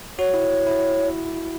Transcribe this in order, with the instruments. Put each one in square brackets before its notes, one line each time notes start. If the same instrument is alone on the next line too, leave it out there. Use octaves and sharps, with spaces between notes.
[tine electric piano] F#4 [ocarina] C#5
[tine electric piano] E4
E4